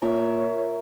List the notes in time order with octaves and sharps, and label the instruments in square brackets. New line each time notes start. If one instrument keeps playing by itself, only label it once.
[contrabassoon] A#2 [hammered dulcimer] A#4 E5 A#5 [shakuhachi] C#5